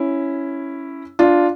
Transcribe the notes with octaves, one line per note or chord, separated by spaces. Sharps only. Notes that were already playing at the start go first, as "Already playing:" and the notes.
Already playing: C#4 E4
D4 F4